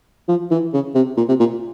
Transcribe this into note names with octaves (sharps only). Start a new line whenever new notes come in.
F3
E3
C#3
C3
A#2
C3
A#2